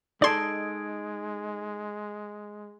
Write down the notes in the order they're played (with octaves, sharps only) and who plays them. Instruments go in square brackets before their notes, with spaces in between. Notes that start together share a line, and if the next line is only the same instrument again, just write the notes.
[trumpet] G#3 [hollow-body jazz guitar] D#4 A4 [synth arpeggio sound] D5 C6 [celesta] D#6 G#6 D7